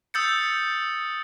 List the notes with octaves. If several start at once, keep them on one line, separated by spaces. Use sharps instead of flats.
D#6 E6 G6 A6 C#7